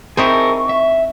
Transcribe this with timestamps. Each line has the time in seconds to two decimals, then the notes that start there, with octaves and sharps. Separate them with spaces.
0.17 C4 D#4 E4 G#4 A#4 C#6
0.69 E5